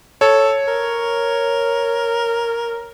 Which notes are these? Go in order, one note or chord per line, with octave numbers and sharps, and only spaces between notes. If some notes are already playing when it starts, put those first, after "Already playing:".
A4 C#5
A#4